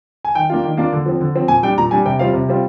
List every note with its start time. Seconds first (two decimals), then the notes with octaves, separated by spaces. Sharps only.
0.25 G#5
0.35 D#3 G5
0.50 A#3 D4 F4
0.64 D#3
0.77 A#3 D4 F4
0.93 D3
1.06 F3 C4
1.21 D3
1.35 F3 C4
1.48 A#2 G#5
1.63 G3 D4 G5
1.78 A#2 A#5
1.91 G3 D4 G#5
2.05 C3 G5
2.19 G3 C4 F4 F5
2.33 C3
2.48 G3 C4 F4